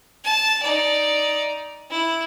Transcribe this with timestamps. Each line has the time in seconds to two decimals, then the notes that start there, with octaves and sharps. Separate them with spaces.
0.24 A5
0.63 D#4 D5
1.90 E4